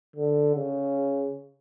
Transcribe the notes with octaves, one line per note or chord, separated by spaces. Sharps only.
D3
C#3